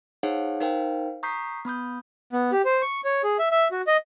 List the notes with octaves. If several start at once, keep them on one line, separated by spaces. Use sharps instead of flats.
D#4 G#4 C5 C#5 F5 F#5
D#4 A#4 C5 F5 G5
A#5 C#6 D#6 G6 B6 C7
B3 B5 D#6 G6
B3
G4
C5
C#6
C#5
G#4
E5
E5
F#4
D#5